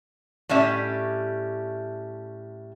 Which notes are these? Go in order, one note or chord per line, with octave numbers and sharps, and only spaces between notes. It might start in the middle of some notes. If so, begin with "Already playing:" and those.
A2 G3 C#4 E5